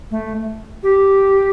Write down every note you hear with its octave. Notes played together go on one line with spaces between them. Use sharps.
A3
G4